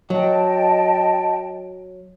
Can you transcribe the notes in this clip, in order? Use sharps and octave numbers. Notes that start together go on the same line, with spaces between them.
F#3 D#5 G5 A5